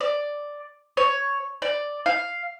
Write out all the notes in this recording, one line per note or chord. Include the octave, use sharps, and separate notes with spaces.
D5
C#5
D5
F5